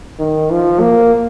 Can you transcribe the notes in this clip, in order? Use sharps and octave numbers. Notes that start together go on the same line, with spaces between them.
D#3
F3
A#3